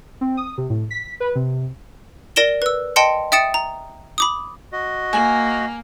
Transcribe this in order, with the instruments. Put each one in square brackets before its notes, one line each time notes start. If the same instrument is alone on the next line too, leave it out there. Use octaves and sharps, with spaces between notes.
[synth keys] C4
D#6
C3
A2
B6
B4
C3
[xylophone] A#4 D5 A#6 D7 E7 G7
B4 E6
D#5 G5 A5 C6 C#7
E5 G5 D#6 A6 C#7 E7
A#5
B5 D6 D#6
[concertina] F#4 D#5
[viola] A#3 [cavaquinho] G#5